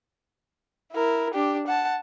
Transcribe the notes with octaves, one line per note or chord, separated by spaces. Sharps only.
E4 A#4
D4 G4
F#5 A5